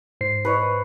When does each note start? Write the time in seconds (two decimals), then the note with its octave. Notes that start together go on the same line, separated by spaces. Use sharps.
0.21 G#2 C5 C7
0.45 B4 C#5 D#5